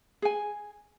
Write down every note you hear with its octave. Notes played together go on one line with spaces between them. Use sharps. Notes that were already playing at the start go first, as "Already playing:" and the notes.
G#4 G#5